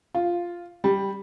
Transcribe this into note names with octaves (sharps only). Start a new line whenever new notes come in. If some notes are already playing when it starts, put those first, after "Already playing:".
F4
G3